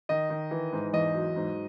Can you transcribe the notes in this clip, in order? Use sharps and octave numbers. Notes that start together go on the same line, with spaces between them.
D#3 D#5
D#3
E3
G#2
E2 D#5
F#3
G#2